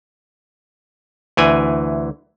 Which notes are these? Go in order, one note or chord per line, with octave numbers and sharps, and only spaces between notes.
D2 E3 G#5